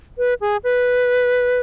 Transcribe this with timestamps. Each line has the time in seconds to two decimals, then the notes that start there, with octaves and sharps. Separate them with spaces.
0.18 B4
0.41 G#4
0.64 B4